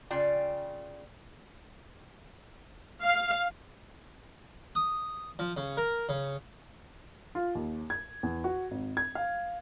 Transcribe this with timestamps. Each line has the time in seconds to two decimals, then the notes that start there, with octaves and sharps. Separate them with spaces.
0.11 C#3 F4 D5 G5
3.02 F5
4.75 D#6
5.39 F3
5.57 C#3
5.77 A#4
6.09 C#3
7.35 F4
7.55 D#2
7.90 G#6
8.23 E2
8.44 F#4
8.71 G#1
8.97 G#6
9.15 F5